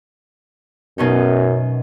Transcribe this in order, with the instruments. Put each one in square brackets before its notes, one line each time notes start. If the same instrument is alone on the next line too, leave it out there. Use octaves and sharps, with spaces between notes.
[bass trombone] F#2 [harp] B2 C#4 D#4